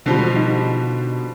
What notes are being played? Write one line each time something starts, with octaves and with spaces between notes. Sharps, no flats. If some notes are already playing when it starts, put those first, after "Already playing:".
B2 D3 F3 G3
D#4